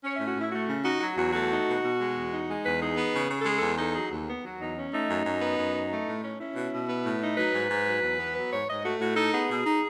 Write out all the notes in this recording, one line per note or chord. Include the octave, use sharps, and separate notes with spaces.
C#4 C#5
A2 E5
F#4
A2 E4
A3 F#4
C#3
D#4 F#4
F#3 F#4
E2 F#4
A3 F#4
D#4
B2
B2
G#3
E2
D#4
G#3
E2 B4
D#4 G#4
B3
C#3
C#3
A4
G#3 G#4
E2 A4
D#4 A4
F#3 G#4
D#2
B3
F#3 F#4
E2 D#4
C#4
A3 D#4
F#2
F#2
B3
F#2
D#4
A3
A2
C#4
C#4 E4
B2
B2
B3
A2
D#4
F#3 B4
G#2
G#2
F#3
E2
B3
F#3 B4
G#2 C#5
G#2 D#5
A3 F#4
A2 F#4
D#4 A4
B3 G#4
B2
D#4